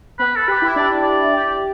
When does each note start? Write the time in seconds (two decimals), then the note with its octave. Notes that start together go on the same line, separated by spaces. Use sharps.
0.19 B3 B4
0.36 A4
0.48 G4 B4
0.62 E4
0.76 D4 D5
1.03 D5
1.33 G4